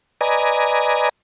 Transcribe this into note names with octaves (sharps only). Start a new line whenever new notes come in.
B4 D5 D#5 G#5 A#5